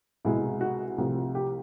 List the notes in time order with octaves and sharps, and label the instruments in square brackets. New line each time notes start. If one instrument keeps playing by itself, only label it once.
[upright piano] C2 B2 G#3 E4
F#4
C2 C3 F3 A3
G4